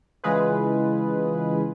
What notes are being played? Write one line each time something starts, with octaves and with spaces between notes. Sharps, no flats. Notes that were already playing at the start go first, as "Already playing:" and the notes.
C#3 E3 G#3 F4 G#4 B4